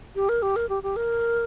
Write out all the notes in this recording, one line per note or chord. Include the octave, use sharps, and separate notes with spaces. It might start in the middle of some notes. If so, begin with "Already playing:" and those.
G4
A#4
G4
A#4
G4
G4
A#4